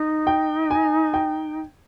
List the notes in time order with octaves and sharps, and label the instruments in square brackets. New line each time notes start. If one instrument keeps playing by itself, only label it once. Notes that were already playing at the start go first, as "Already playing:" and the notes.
Already playing: [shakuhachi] D#4
[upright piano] G5
G#5
G5